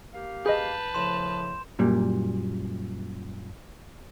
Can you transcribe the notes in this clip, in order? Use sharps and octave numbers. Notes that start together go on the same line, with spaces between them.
A#3 G4 F5
G#4 B4 D#5 A5 G6
A2 C#3 F3 C6 E7
F#2 A#2 G3